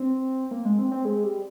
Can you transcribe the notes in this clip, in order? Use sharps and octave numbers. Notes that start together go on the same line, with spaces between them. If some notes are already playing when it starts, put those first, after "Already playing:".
Already playing: C4
A#3
G#3
C4
C4
G#3
G3